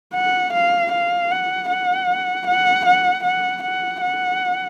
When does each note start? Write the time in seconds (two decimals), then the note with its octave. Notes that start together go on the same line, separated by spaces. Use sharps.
0.15 F#5
0.53 F5
0.92 F5
1.31 F#5
1.69 F#5
2.47 F#5
2.86 F#5
3.24 F#5
3.63 F#5
4.01 F#5